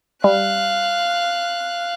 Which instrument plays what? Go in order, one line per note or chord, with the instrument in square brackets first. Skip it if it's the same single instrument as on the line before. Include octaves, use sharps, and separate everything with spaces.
[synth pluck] G3 [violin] F5 F#6